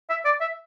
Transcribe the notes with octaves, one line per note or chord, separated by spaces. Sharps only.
E5
D5
E5